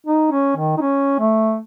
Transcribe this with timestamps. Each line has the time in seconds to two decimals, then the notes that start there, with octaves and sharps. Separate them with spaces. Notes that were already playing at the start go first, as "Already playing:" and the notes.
0.07 D#4
0.32 C#4
0.57 D#3
0.77 D#4
0.81 C#4
1.19 A3